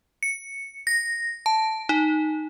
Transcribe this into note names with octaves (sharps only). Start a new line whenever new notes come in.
C#7
A#6
A5
D#4